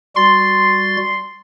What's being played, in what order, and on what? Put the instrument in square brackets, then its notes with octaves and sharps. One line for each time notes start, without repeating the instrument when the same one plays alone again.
[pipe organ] G3 F#4 A6 [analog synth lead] C6